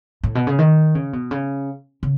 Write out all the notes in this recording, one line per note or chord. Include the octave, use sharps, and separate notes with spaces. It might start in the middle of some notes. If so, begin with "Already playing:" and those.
A2
B2
C#3
D#3
C#3
B2
C#3
C#3